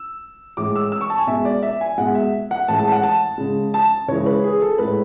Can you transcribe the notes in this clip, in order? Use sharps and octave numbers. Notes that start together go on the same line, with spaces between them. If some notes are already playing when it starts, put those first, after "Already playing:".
Already playing: E6
A2 E3 G#3 D6
E6
E6
C#6
A5
G#5
B2 G#3 E5
D5
E5
G#5
B2 G#3 F#5
E5
F#5
A2 E3 G#3 A5
A5
F#5
A5
C#3 G#3
A5
C#3 E3 G#3 C#5
B4
G#4
A4
A2 G#3 B4